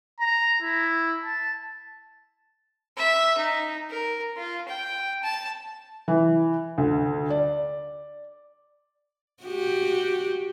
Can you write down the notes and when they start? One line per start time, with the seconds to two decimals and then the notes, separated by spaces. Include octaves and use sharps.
0.20 A#5
0.62 E4
1.24 A5
2.97 E5
3.37 D#4
3.90 A#4
4.37 F4
4.68 G5
5.23 A5
6.08 E3
6.78 D2
7.30 D5
9.43 F#4 G4